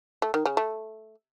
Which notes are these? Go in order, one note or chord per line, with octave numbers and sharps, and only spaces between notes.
A3
D#3
C#3
A3